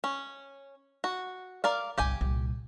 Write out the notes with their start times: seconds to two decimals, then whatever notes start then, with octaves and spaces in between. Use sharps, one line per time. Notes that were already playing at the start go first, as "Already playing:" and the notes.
0.04 C#4
1.04 F#4
1.64 A#4 D5 F5
1.98 G1 C2 G4 G5 G#5
2.21 C2 A#2